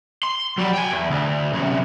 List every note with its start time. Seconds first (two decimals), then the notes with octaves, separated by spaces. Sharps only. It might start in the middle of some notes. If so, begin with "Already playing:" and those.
0.23 C6
0.58 F#3 G3
0.73 G5 G#5
0.91 E2
1.11 D2
1.54 C2 F#2